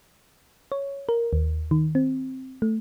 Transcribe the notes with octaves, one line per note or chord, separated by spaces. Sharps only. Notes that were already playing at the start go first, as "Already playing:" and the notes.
C#5
A#4
D#2
D#3
C4
A3